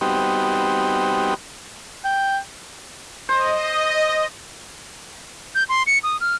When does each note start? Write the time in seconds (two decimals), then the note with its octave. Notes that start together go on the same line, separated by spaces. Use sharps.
0.01 G3 B3 C4 D#4 F#4 G4
2.04 G5
3.29 C5 D#5
5.55 G6
5.69 C6
5.87 C#7
6.04 D#6
6.21 F6